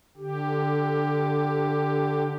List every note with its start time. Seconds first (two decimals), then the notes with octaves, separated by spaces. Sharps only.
0.17 D3 G4